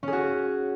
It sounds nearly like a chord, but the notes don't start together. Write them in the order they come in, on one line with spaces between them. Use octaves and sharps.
C#4 G#4 F#4